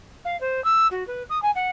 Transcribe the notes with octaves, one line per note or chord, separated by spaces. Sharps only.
F5
C5
E6
F#4
B4
D#6
G#5
F#5